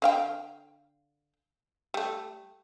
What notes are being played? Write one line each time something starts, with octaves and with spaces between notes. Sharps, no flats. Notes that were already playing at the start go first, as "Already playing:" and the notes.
D3 F5 G5
G3 A3